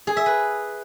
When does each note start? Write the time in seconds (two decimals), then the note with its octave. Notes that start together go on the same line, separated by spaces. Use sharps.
0.07 G#4
0.17 E5
0.26 B4